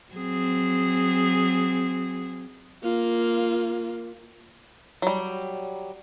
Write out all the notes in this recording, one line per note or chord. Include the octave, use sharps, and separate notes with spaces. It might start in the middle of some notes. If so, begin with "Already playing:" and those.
F#3 C4 G#4
A#3 F4
F#3 G3